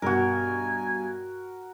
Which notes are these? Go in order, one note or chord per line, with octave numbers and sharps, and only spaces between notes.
G2 B2 F#4 A#4 G#5